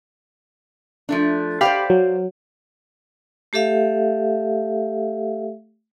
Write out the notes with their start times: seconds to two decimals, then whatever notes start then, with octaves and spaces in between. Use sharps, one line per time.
1.09 F3 A3 D4
1.61 G4 C5 D5 F5 B5
1.90 F#3
3.53 A3 G4 A4 E5 F5